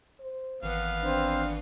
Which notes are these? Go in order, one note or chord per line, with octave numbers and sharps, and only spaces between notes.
C5
G#1 E3 B3 F5
C4 D4 C5